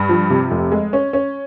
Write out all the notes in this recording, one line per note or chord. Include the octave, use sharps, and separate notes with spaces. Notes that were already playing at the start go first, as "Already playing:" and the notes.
Already playing: G2
F3
C3
F1
G#3
C#4
C#4